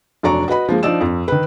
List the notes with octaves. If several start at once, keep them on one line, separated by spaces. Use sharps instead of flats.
F1 F#3 D4 D5 A#5 C#6
F#4 B4 D#5 B5
F3 G#3 A#3
F3 D4 D#4 D5 E6 E7
F2
D#3 B4